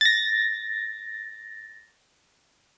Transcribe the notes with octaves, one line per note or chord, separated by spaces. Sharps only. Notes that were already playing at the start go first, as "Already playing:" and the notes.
A6 A#6